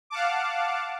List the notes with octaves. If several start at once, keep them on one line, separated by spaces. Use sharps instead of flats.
F5 F#5 A5 D6